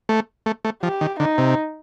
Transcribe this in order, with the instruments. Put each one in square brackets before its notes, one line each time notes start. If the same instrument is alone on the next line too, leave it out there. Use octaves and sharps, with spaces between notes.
[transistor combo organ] A3
A3
A3
[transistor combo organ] F3 [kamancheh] G4
[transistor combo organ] D#3
[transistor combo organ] D3 [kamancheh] D#4
[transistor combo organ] C3